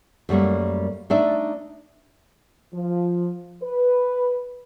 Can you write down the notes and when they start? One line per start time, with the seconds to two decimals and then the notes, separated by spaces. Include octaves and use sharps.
0.29 F#2 G3 A3 A#3
1.10 A3 D4 D#4 D5 E5
2.73 F3
3.63 B4